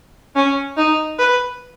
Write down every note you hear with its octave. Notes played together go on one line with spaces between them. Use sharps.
C#4
D#4
B4